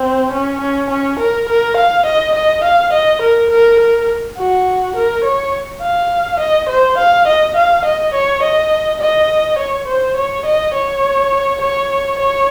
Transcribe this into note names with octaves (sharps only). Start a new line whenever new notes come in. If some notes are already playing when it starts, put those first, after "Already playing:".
Already playing: C4
C#4
C#4
C#4
A#4
A#4
F5
D#5
D#5
F5
D#5
A#4
A#4
A#4
F#4
A#4
C#5
F5
D#5
C5
F5
D#5
F5
D#5
C#5
D#5
D#5
C#5
C5
C#5
D#5
C#5
C#5
C#5